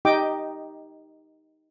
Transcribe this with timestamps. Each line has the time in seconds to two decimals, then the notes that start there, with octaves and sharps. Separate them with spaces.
0.05 D#4 G4 D#5 G5 D6